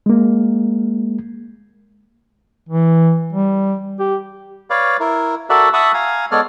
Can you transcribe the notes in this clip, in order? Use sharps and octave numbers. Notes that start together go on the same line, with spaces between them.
G#3 A#3
E3
G3
G4
B4 C#5 D5 F5
E4 A#4
F#4 A4 A#4 D5 E5 F#5
E5 F#5 A5 B5 C#6 D#6
F5 G#5 A#5
G#3 B3 A4 C#5 D5 F6